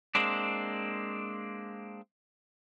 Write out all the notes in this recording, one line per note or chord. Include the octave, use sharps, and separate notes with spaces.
G#3 A#3 C4 D4